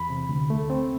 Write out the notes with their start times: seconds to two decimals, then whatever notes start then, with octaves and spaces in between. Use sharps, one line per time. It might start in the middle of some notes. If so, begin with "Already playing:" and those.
Already playing: E2 B5
0.10 C3
0.29 D2
0.50 A3
0.70 C4